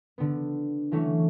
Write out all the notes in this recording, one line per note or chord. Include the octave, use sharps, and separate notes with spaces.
D3 B3
E3 F#3 A3 C#4